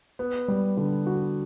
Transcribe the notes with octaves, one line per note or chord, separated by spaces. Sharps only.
B3
G3
D3
F#4